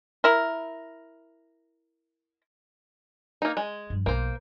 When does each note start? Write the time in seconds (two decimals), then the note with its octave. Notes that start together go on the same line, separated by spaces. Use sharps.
0.24 E4 A#4
3.42 A#3 D#4
3.57 G#3
3.90 G2 F3
4.06 B1 A#3 C5